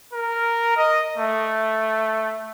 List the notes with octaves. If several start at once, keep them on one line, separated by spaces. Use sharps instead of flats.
A#4
D#5
A3